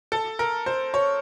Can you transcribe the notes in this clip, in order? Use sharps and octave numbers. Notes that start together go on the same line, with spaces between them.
A4
A#4
C5
C#5